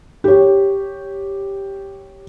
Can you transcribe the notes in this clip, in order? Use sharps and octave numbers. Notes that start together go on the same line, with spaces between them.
G4 C#5